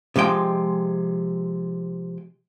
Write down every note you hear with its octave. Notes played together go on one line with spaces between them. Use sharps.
C3 F3 G#3 G5